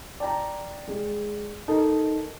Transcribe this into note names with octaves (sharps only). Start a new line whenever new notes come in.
D5 G5 A5 A#5
G#3
D#4 A4 A#4 D#5 A5